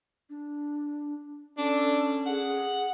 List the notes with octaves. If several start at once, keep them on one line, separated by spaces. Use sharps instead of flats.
D4
C#4 D4 A4
G#4 F#5